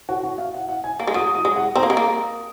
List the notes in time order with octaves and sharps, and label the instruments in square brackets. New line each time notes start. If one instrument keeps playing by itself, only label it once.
[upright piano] F#4
F#4
F5
F#5
F#5
G#5
[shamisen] A#3
G#3
[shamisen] F#3 [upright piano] D#6
[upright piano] D#6
[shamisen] G#3
[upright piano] F#5
[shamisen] C4 [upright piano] A#5
[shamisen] A#3
G#3
A#3